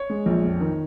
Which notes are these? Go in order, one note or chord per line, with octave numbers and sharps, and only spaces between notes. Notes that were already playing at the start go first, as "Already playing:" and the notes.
Already playing: C#5
G#3
A#1
F2
D#3